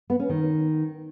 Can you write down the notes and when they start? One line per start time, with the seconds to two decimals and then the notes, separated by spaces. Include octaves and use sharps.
0.10 B3
0.20 C#4
0.29 D#3